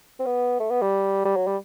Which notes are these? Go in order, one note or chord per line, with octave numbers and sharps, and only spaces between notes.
C4
B3
A3
B3
G3
G3
F#3
G3